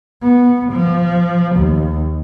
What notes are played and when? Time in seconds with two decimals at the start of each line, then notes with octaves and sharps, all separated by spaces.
0.22 B3
0.73 F3
1.56 D#2